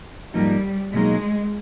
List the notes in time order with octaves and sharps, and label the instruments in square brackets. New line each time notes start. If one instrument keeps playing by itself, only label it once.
[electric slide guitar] G#2 F3 A#3 D#4 [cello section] G3
[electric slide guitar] B2 F#3 A#3 D#4 [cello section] G#3